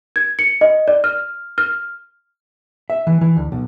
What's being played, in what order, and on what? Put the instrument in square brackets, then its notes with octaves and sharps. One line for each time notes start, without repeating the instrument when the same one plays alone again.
[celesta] G#6
C#7
D#5
D5
F6
F6
[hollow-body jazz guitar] E5
E3
E3
D2
B1